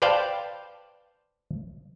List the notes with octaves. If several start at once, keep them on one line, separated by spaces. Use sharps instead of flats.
B4 C5 D5 F5 G5 A5